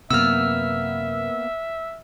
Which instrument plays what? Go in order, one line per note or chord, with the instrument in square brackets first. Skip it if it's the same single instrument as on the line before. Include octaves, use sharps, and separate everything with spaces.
[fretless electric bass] F#2 C3 [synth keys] A#3 B3 [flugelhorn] E5 [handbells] E6 F6